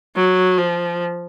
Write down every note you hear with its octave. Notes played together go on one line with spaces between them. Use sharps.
F#3
F3